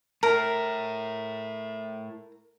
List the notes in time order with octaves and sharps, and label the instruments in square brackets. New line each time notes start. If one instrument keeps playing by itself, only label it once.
[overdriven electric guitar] A3 E4 [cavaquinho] A#4